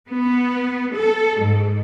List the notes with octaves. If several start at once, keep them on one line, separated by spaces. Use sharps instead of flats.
B3
A4
G#2